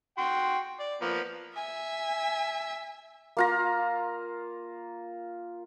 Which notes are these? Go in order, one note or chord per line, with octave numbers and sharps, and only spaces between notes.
F#4 G5 C6
D5
F3 A#3 B3
E5 G#5
A#3 F4 A#5